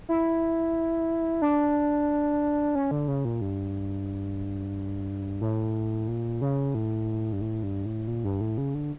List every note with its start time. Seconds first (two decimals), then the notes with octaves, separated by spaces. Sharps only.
0.09 E4
1.42 D4
2.75 C#4
2.91 D3
3.08 C#3
3.25 A#2
3.41 G2
5.41 A2
6.08 A#2
6.41 C#3
6.75 A2
7.33 G2
7.41 A2
7.63 G2
7.86 A2
8.07 A#2
8.24 G2
8.41 A2
8.58 C#3
8.74 D3